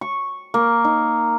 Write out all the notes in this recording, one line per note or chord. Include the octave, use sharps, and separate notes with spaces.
C#6
A#3
D#4